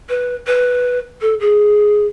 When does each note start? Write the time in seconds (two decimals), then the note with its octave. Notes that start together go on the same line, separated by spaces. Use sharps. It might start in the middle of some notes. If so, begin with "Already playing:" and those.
0.09 B4
0.46 B4
1.21 A4
1.39 G#4